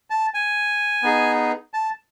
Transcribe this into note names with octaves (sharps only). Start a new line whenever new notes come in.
A5
G#5
B3 D#4 G#4
A5